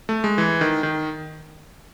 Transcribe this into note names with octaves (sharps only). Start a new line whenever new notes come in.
A3
G#3
E3
D#3
D#3